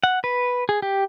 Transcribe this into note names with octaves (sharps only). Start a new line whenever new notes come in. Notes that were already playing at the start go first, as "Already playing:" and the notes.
F#5
B4
G#4
G4